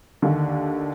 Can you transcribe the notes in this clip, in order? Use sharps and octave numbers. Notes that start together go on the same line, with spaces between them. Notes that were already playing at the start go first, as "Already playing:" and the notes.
D#2 D3